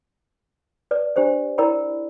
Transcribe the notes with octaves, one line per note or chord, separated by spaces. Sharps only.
B4 D5
D4 G4 C5 D5
E4 A#4 D5 G5 B5